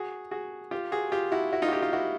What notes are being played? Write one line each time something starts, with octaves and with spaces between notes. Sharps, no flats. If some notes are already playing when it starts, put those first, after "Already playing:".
Already playing: F#4 G#4
F#4 G#4
F4 G4
F#4 G#4
F4 G4
E4 F#4
E4 F#4
D#4 F4
F#4
F4 G4
F4 G4
E4 F#4